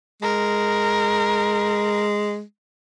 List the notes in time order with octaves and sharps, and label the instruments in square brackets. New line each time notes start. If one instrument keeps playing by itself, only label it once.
[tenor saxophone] G#3 [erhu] A#4